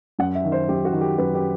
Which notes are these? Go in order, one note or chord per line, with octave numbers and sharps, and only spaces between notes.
F#2 F#5
E5
D#3
C5
F#2 G4
F#4
D#3
G4
F#2 B4
G4